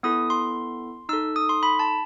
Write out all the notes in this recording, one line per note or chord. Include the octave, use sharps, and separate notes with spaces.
B3 E4 A4 D#6
C6
D#4 A4 E6
D#6
C6
B5
A5